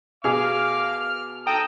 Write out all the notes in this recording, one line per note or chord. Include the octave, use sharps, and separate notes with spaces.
B2 G#4 F5 D6 F6
A4 G5 A#5 D#6